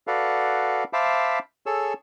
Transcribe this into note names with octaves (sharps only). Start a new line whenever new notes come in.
F#4 A4 B4 D5 F5 F#5
C5 E5 F5 A5 B5 D6
G#4 A4 C#5 E6